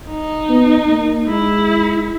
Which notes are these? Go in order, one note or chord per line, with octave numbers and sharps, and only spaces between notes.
D#4
B3
A#3
G#3 E4